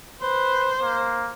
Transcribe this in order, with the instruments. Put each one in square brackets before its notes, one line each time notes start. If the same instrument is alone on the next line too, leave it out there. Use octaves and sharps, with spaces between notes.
[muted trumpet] B4 [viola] C5
[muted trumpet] A#3